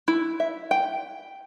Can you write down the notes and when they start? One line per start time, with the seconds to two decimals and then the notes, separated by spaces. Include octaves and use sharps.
0.08 E4
0.40 E5
0.71 G5